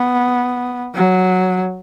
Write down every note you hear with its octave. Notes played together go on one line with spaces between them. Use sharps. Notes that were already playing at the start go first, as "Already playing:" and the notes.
Already playing: B3
F#3